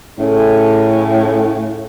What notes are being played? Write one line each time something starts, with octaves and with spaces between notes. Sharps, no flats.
A2 C#3 C#4 A4